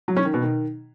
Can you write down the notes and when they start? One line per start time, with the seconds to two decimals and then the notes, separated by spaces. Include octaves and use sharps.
0.08 F#3
0.17 C#4
0.25 D#3
0.34 B2
0.42 D#3